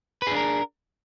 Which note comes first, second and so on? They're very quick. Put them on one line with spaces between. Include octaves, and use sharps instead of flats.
B4 G#4 D4 A#4